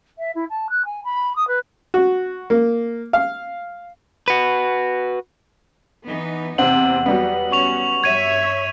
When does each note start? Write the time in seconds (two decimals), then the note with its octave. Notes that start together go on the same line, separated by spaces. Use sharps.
0.18 E5
0.35 E4
0.49 A5
0.69 F#6
0.85 G#5
1.04 B5
1.35 D#6
1.47 B4
1.94 F#4
2.50 A#3
3.13 F5
4.28 F#4 B4
6.08 E3 B3 D#4
6.58 E2 C3 C4 F#5 F#7
7.06 F#3 G3 B3
7.52 C#4 C#6 F7
8.04 G2 C#5 E5 G#6 D#7